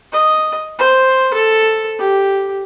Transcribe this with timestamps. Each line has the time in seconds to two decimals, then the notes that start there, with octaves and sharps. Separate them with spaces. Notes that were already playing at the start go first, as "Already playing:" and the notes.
0.12 D#5
0.78 C5
1.33 A4
1.98 G4